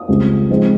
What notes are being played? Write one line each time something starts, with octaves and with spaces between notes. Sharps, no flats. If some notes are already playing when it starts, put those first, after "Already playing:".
Already playing: D#6
C#2 C#3 G3 C4
G#2 F3 G#3 C4